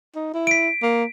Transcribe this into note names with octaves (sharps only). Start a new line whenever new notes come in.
D#4
E4
B6 D7
A#3